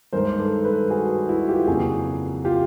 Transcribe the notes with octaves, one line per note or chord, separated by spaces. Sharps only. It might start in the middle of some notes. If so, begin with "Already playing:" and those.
G2 D#3 G#3 A#4 C5
A4 B4
A4 B4
F#4 G#4
E4 F#4
F4 G4
F2 C#3 F#3 A#3 F#4 G#4
F4 G4